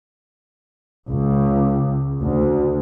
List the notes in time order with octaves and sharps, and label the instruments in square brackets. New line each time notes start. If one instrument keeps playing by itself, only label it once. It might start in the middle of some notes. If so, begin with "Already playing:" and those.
[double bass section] C#2
D2